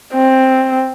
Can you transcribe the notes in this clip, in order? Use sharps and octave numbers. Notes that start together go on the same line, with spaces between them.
C4